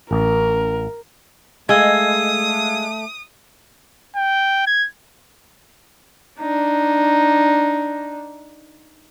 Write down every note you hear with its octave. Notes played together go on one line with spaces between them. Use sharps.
A1 A#4
G#3 A3 F5 D#6 E6 G#6
G5
G#6
D4 D#4